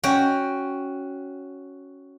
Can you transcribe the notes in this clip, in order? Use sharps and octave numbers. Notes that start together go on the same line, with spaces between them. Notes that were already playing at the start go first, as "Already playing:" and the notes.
C#4 F#4 G5